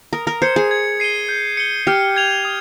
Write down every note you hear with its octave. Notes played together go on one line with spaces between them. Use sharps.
A#4 D#6
A#4
C5 G#6 C#7
G#4
G#6
C7 D#7 G7
G6
C#7 G7
G4 F6
G#6 C#7 F7
D#6